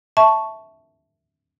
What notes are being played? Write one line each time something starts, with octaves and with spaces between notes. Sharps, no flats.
E5 A5 C#6